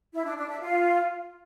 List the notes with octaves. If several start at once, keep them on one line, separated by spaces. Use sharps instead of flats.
E4
D4
D4
E5
F4